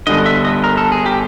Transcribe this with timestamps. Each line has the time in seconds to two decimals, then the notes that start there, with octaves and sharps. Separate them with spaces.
0.07 G1 G2 D3 D#5
0.26 E5
0.45 D#5
0.64 A#4
0.77 A4
0.92 G#4
1.06 G4